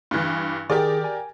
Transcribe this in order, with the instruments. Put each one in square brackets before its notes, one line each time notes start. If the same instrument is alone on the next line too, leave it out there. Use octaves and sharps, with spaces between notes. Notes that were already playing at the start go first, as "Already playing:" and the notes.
[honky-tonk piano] G2 E3
[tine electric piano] D#3 G#4 [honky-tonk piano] G4 A#4 D5
[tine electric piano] G#5